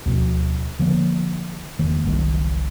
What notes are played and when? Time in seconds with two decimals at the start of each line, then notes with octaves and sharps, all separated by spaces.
0.06 D2 B2 F3
0.79 D3 F3 A#3
1.79 E1 D#3 A#3
2.04 F#1 C2 D#3 G3